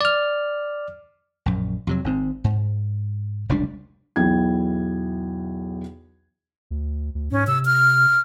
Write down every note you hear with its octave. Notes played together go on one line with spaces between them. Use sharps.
D5 F6
A#1 F#2
F2 C3 F#3
G#1 G#2 C4
G#2
F1 C#2 G3 D4
B1 E2 E4 G5 G#6
D2
D2
G#2 C#4
C3 E6
F6